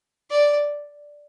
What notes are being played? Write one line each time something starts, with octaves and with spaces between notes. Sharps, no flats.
D5